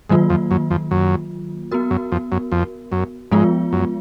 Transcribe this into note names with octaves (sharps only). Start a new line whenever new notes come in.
G#2 D#3 F#3 A#3 F4
F2
F#2
F2
F#2
B3 F#4 A#4
F#2
F2
F#2
F2
F#2
G#2 F3 G#3 B3 F4
F#2